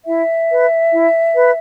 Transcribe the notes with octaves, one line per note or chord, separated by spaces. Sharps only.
E4 E5
B4
E4
B4